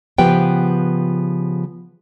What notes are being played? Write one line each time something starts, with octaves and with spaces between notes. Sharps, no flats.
C#3 F3 B3 G4 B4 G5